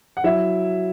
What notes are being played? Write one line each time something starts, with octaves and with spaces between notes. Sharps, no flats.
F#5
F#3 E4 E5